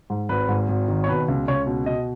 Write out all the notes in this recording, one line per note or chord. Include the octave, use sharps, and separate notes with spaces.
G#2
G#1 B4
G#2
G#1
D#3
C#5
B2 B4
C#2
C#2 C#5
B2
B2 D#5